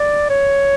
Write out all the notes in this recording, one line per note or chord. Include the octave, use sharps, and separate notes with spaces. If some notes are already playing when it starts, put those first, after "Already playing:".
Already playing: D5
C#5